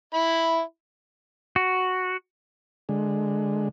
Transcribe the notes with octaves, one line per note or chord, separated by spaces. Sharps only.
E4 B5
F#4
D3 G#3